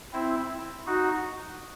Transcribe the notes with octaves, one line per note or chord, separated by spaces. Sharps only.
C4 E4
D#4 F#4